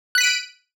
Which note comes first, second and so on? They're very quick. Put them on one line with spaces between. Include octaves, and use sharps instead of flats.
F#6 B6 D#7 D7